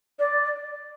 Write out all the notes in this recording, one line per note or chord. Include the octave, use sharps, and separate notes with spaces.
D5